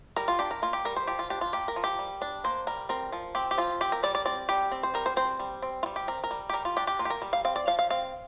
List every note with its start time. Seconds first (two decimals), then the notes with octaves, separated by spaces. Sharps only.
0.16 G3 A#4
0.28 F4
0.39 D4 G4
0.51 A#4
0.62 A#3 F4
0.73 G4
0.85 G3 A#4
0.96 C5
1.07 F3 G4
1.19 F4
1.30 D4 G4
1.41 F4
1.53 A#3 G4
1.68 A#4
1.76 F3
1.84 G4
1.99 G3
2.22 D4
2.44 A#3 C5
2.67 G3 A#4
2.89 C4 A#4
3.12 F3
3.35 C4 G4
3.51 G4
3.58 F3 F4
3.81 C4 G4
3.92 A#4
4.03 G3 D5
4.15 D5
4.26 C4 D5
4.49 G3 G4
4.71 C4
4.83 C5
4.94 G3 A#4
5.06 C5
5.16 C4 C5
5.40 G3
5.62 C4
5.83 F4
5.86 G3
5.96 G4
6.08 C4 A#4
6.24 A#4
6.31 G3
6.49 G4
6.53 G3 A#4
6.65 F4
6.77 D4 G4
6.87 G4
6.99 A#3 F4
7.05 G4
7.10 A#4
7.22 G3
7.33 F5
7.45 C4 F5
7.56 D5
7.67 F3 F5
7.79 F5
7.90 C4 F5